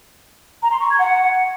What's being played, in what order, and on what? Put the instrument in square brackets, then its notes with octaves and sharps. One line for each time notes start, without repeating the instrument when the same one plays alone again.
[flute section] A#5
C6
C#6
G#6
F#5